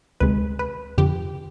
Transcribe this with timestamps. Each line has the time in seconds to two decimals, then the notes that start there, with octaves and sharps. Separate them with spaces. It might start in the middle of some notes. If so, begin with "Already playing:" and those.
0.20 D2 C3 D#3 G#3 B4
0.59 B4
0.98 F2 D3 F3 G4